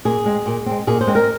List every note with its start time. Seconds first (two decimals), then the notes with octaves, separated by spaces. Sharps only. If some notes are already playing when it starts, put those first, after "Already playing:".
0.05 A#2 G#4
0.25 G#3 C4
0.46 A#2
0.66 G#3 C4
0.87 A#2 G#4
1.01 C5
1.07 G#3 C4
1.15 A#4